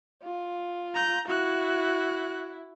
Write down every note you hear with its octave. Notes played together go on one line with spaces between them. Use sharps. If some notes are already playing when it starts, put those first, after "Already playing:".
F4
A#5 G6
E4 F#4 F#6